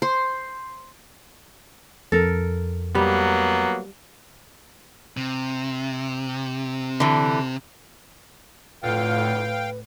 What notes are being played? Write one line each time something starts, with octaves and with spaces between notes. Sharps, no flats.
C5
F2 A4 A#4
F#3 G3 A#3 B3
C3
D3 E3
F2 A2 D3 F4 B4 F5 G5